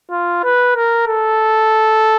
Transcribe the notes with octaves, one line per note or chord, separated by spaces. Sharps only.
F4
B4
A#4
A4